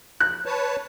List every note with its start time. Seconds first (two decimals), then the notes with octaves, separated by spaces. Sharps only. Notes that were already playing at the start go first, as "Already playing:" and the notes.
0.20 F#6
0.46 B4 C#5 A5